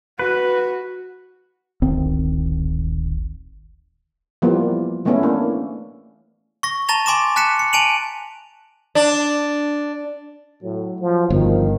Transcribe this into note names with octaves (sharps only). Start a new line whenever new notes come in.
F#4 B4
D1 G#1 D#3 C4
E3 F3 G3 A#3 B3 F4
E3 A3 B3 C#4 E4
A#3 D4
C#6 A#6
A5 A#5 A6 A#6 F7 G7
G#5 C6 D6 A#6 E7
A5 F#6 B6 C#7 E7
C#7
G#5 A5 D7 D#7 F7 F#7
D4
A2 F#3
F3
G1 D#3 F3